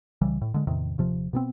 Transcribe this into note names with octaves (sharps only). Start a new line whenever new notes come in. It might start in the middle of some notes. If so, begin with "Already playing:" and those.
C2 C#3 E3 G3
A2
D3 G#3
E2 A2 C3 D#3
D#1 C3 F3
B2 B3 C4